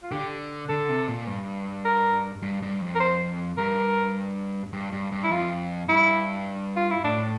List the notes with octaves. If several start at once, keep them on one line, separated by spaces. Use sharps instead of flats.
F4
D3 G4
D3 A4
C3
A#2
G2
A#4
G2
G2
F2
A#4
C5
G2 A#4
G2
G2
G2
E4
F2 F4
G2 E4
F4
E4
A2 D4